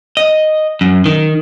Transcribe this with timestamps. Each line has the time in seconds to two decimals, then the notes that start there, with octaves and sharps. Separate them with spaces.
0.17 D#5
0.81 F#2
1.06 D#3